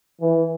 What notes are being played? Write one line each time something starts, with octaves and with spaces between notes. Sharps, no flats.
E3